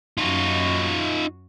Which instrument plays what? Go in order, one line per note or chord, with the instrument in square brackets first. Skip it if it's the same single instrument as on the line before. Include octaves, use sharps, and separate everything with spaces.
[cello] F#2 F#4 [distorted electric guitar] D#4 F4